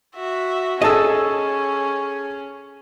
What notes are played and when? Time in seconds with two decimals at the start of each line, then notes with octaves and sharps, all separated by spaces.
0.16 F#4 E5
0.82 C#4 G#4 A4 D#5 A5 E6